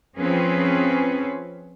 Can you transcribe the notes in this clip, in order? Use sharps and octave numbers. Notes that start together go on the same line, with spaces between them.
F3 C4 C#4 G#4 B4